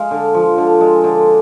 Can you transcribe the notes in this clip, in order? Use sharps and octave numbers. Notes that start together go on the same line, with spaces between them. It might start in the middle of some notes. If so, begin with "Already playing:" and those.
Already playing: G#3 F5
D3
F3
D3
G#3
D3